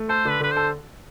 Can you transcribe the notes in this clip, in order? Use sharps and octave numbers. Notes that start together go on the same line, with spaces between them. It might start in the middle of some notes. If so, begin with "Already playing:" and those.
Already playing: A3
A4 C5
D3 B4
D3 B4
C5
A4